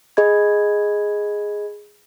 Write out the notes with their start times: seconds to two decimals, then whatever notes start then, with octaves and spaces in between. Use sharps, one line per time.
0.17 G#4 D#5 B5 G#6